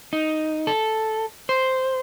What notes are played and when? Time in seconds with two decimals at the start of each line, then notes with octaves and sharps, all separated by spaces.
0.13 D#4
0.67 A4
1.49 C5